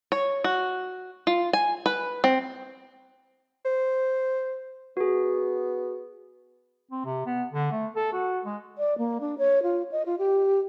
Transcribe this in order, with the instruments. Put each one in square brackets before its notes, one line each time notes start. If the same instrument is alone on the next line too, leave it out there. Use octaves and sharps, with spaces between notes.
[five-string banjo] C#5
F#4
F4
G#5
B4
C4
[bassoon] C5
[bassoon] B3 [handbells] F#4 G#4
[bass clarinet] C4
C3
B3
D3
A3
A4
F#4
G#3
[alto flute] D5
A#3
D4
C#5
F4
D#5
F4
G4